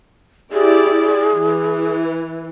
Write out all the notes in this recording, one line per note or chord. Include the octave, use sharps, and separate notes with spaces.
E4 G4 G#4 D5
E3